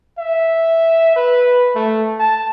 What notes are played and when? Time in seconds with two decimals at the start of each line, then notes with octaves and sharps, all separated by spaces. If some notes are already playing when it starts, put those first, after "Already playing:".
0.18 E5
1.16 B4
1.76 A3
2.20 A5